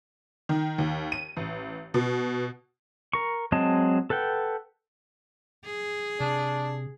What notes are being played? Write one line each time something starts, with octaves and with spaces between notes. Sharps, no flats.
D#3
D#2
D#7
A1
B2
A#4 C#6
F#3 G#3 C4 D#5 A5
A4 B4 F#5 G5
G#4
C3 D4